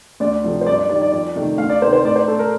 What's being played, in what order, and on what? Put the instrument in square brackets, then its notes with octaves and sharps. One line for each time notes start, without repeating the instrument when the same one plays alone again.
[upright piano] D2 D5
C3 F3 A3
C5
G2 D5
D5
D#3 G3 D5
D5
F2 D5
C3 D#3 A3
D2 F5
D5
C3 D#3 A3 C5
C5
A2 D5
C5
A3 A4
A#4